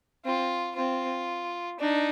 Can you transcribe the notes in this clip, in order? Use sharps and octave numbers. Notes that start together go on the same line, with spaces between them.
C4 F4
C4 F4
D4 D#4